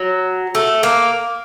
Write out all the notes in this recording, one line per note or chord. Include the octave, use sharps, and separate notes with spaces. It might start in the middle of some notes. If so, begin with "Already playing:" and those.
Already playing: F#3
A3
A#3